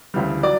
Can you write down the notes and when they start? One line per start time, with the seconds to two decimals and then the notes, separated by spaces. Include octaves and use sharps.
0.14 D2 C#3 E3 G3
0.43 F#3 D5